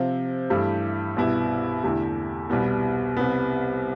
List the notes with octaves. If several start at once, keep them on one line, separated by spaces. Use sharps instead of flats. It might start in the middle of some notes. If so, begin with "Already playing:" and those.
Already playing: C3 F3 C4 F4
G2 E3 A3 E4 G4
C2 B2 B3 E4 G4
E2 D3 A3 E4 G4
C2 B2 G3 B3
C2 C3 G3 B3